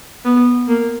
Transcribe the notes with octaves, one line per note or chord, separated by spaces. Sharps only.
B3
A#3